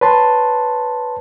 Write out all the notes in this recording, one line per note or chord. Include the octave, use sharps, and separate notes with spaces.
B4 C#5 A5 C6